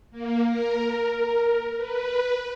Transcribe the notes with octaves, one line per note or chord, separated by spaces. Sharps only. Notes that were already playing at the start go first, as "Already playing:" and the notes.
A#3
A#4
B4